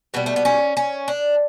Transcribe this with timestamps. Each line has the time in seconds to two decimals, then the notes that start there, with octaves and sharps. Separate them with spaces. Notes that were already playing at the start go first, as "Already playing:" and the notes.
0.14 B2 G3 B3
0.26 A3
0.36 B3
0.45 C#4
0.77 C#4
1.08 D4